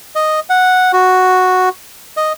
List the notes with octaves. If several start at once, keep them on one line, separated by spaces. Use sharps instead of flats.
D#5
F#5
F#4
D#5